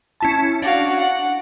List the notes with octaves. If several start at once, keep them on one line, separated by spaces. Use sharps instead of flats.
C#4 E4 A5
D4 F#4 F5
F#5